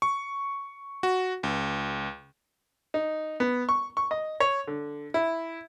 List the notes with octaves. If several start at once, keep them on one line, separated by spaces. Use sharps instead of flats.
C#6
F#4
C#2
D#4
B3
C#6
C#6
D#5
C#5
D3
E4